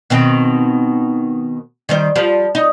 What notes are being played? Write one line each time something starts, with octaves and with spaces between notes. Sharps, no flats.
B2 D#3 C4
D#3 G3 C5
F3 G3
D#4